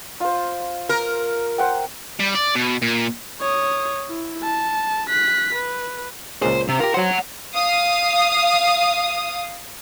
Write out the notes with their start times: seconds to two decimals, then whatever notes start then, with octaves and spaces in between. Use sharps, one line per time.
0.20 F4 C5
0.89 A#4
1.58 C5 F#5 G5
2.19 G3
2.35 D5
2.55 B2
2.82 A#2
3.41 C#5 D#6
4.08 E4
4.43 A5
5.09 F#6 B6
5.55 B4
6.42 C#2 A#2 G#4 C5
6.68 C3
6.80 F4 G4 A#4
6.94 F#3 C5 C#5 F#5
7.54 F5 D#6